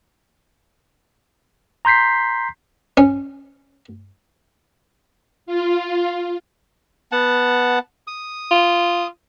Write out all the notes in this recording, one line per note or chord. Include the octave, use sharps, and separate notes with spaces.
A#5 C6 G6 B6 C7
C#4
F4
B3 F#5 A5
D#6
F4